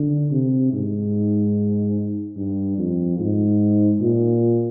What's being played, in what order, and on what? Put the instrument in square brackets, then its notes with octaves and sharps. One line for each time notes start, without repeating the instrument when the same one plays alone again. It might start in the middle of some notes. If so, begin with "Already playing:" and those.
Already playing: [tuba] D3
C3
G#2
G2
F2
G#2
A#2